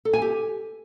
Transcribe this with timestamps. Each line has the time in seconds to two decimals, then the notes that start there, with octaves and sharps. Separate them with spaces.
0.05 A4
0.13 G#5
0.22 G4